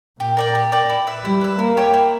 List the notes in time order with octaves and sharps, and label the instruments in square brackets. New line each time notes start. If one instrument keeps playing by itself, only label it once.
[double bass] A#2 [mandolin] G4
[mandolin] A#4 D5 G5
G4
A#4 D5 G5
E4
B4 E5
[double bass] G3 [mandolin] E4
[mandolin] B4 E5
[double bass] A#3 [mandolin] E4
[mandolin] G4 C#5 G5
E4